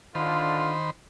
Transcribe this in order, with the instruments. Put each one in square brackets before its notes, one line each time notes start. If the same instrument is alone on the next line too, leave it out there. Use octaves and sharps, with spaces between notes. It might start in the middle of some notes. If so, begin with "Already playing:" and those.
[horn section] D3 F4 [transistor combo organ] D#3 C5 B5